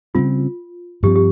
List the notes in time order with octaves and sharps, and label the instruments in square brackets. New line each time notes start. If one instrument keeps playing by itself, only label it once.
[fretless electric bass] C#3 G3 C4 [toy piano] F4
[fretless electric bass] G2 F3 C4 [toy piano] G4
[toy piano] G4